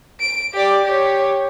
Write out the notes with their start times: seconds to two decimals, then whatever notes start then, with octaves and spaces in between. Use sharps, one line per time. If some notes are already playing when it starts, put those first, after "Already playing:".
0.20 D7
0.54 G4 D5
0.85 G4 C#5